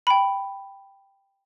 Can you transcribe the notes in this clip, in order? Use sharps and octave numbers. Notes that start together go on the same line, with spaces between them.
G5 B5